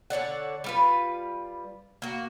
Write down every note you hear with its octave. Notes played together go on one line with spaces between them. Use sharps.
D3 C#5 D5 F#5
G3 F4 B4
A#3 F#4